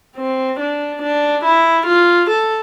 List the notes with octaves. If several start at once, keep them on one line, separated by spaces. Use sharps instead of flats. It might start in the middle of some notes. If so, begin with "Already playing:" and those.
C4
D4
D4
E4
F4
A4